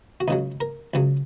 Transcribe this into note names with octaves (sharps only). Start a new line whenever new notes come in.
F#4
C#2 C#3 F#3 D#4
A#4
C#2 C#3 F#3